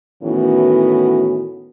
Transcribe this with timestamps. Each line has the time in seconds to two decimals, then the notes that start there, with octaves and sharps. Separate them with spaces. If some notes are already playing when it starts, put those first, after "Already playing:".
0.23 A2 D#3 E3 B3 C#4 F#4